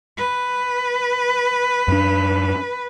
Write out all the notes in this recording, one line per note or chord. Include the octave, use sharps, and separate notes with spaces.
B4
F#2 D4